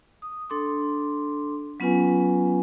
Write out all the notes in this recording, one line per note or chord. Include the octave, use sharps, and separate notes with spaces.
D#6
D4 A4 C6 D6
F#3 B3 C#4 F4 B4 G#5